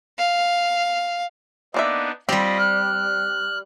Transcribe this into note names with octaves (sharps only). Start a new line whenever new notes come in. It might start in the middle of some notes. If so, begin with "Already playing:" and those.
F5
A#3 B3 D4 D#4 D5 E5
G3 C4 F4 G4 D#5 B5
F6 F#6